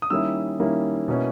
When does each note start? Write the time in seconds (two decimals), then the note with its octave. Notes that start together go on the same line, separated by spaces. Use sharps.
0.02 D#6
0.10 D#3 G3 A#3 C#4 E4 E6
0.59 D#3 G3 A#3 C#4 E4
1.08 B2 A#3 C#4 E4